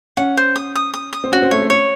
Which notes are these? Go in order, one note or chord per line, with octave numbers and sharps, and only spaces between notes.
C#4 F#5
C5
D#6
D#6
D#6
D#6
C4
C#4 F#4
C4
A3 C#5
A3
C#5